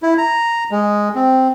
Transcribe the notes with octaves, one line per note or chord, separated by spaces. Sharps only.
E4
A#5
G#3
C4